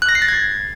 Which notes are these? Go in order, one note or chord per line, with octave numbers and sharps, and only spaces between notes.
F#6
A#6
C7
A6
G#6